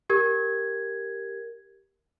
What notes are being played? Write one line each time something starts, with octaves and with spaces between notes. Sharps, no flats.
G4 A#4 G#6